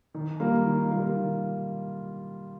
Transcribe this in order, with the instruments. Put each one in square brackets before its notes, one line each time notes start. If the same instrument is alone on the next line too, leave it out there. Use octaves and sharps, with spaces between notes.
[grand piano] D#3
G3 A#3 F4 A#4
D#3
G3 A#3 F4 A#4
D#3